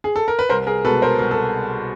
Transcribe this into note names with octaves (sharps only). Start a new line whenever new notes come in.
G#4
A4
A#4
B4
C2 A#4 C5
G#4 A#4
B2 G#3 A4 B4
A#4 C5
C2 A#4
A4